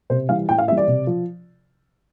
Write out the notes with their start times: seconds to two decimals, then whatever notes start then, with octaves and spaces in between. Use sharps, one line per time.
0.10 C3 C5
0.29 E3 G3 F5
0.49 A2 G5
0.58 F5
0.68 E3 E5
0.72 G3
0.77 D5
0.87 C3
1.07 F3